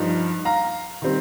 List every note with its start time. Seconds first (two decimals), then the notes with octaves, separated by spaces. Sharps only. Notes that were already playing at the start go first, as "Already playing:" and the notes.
Already playing: G2 F3 D#4
0.45 F5 A#5
1.02 D#3 G3 C4